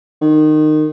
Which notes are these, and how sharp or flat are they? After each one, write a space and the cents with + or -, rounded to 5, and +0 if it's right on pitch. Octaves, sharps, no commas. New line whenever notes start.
D#3 -20